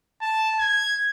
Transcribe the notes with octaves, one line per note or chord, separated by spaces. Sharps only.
A5
G#6